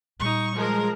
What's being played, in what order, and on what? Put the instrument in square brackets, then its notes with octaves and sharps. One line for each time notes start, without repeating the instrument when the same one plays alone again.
[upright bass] A#2 G3 [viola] D#4 C#6
[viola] F3 [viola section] G#3 A#4